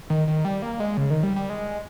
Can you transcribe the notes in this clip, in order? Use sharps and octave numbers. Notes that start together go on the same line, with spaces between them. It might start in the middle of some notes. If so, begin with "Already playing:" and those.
D#3
D#3
G3
A#3
G#3
C#3
D#3
G3
G3
G#3